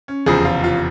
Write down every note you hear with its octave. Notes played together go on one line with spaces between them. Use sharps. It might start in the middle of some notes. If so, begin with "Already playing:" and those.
C#4
F1 E2 C#3 F3 G#4
F4
F4